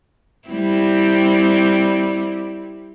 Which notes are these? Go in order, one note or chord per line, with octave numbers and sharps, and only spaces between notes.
G3 C4 E4